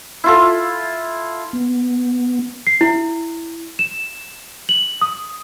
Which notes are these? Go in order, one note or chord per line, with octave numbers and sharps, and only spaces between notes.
E4 F4 A4
B3
C7
E4
E7
F#7
D#6